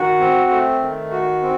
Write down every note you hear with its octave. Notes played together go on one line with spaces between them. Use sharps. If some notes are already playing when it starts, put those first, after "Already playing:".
Already playing: D#3 F#4
C4
A3
D#3
F#4
C4